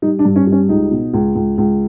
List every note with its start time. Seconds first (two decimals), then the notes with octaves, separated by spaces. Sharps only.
0.02 G3 D#4
0.19 D4
0.25 G2
0.36 C#4
0.47 G3
0.52 C#4
0.69 C#2 D#4
0.91 B2
1.14 C#2
1.35 C#2
1.58 C#2